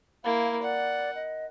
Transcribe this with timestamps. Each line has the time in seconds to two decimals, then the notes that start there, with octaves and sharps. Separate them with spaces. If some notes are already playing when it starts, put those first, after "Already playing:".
0.24 A#3 E4 F5
0.62 D5 F#5
1.15 D#5